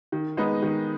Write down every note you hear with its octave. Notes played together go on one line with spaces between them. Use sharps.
D#3
G#3 B3 D#4
D#3